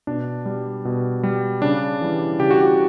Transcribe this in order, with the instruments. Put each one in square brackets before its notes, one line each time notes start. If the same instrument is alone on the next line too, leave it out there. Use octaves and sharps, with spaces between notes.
[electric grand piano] B2 D4
G3
B2
G3
C#3 D4
E3 G3
C#3 G4
F#4
G4